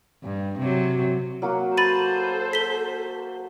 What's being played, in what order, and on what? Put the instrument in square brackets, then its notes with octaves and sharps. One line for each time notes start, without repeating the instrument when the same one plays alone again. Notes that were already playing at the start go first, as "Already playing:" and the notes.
[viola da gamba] G2
C3 F#3
[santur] F#3 A#3 F#4
[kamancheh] A4 C5 [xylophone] B5 A6 D#7
[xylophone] B6 G7